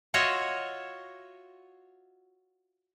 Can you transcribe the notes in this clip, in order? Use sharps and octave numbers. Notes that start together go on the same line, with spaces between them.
F4 F#4 C#5 D#5 E5